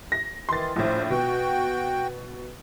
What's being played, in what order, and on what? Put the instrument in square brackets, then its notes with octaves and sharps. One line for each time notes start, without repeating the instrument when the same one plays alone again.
[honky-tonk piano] A#6
[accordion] D#3 E3 [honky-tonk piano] C6 A6
[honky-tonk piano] A#1 A2 [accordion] C5
[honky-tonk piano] B2 [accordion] F#4 G5